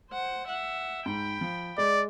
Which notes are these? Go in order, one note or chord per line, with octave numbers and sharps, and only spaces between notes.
C5 F#5
E5 F#5
G#2 G5 B5
F3
G#3 D5